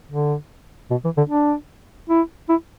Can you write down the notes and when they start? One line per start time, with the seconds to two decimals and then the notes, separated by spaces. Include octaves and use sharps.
0.11 D3
0.90 B2
1.04 E3
1.17 D3
1.30 D4
2.09 E4
2.49 E4